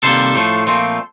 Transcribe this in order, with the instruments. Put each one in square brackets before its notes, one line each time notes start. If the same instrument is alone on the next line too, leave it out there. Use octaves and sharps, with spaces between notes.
[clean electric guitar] C3 D#3 G3 A#3 A4 C5
A2 F3 A3
A#2 F3 A3 C4